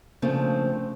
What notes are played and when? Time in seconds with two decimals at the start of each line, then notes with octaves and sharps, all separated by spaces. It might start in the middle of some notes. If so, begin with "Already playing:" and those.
0.22 C#3 F3 A3 A#3 C4 D4